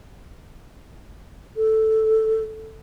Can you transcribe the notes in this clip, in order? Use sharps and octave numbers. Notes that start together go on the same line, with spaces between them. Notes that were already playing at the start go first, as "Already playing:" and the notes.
A4